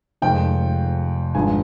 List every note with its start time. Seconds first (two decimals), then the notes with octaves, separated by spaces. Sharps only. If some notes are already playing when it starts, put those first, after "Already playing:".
0.22 F1 F2 D#3 G#3 G5
1.34 G#1 G2 F3 G#3 G#5